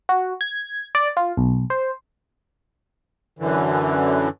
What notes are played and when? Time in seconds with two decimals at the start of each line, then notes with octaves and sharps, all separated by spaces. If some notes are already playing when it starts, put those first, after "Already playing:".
0.09 F#4
0.41 G#6
0.95 D5
1.17 F4
1.37 B1
1.70 C5
3.39 F#2 D3 E3